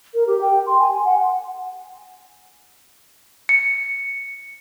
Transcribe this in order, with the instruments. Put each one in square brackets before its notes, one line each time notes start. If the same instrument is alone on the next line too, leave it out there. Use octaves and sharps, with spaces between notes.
[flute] A#4
G4
G5
C6
G#5
G#5
F#5
[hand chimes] C#7